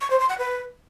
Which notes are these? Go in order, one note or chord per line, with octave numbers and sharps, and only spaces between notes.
C#6
C5
C6
F#5
B4